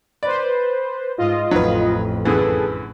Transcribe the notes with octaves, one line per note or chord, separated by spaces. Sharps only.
B4 C5 D5
G#2 F4 D#5
A1 F2 F#3 B4
F#2 D3 E3 G#4 A4 B4